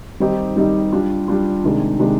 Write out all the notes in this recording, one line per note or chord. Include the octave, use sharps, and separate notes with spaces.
D#3 G3 C4 D#4 G4
D#3 G3 C4 D#4 G4
G3 D4 F4
G3 D4 F4
C3 D#3 G#3 D4
C3 D#3 G#3 D4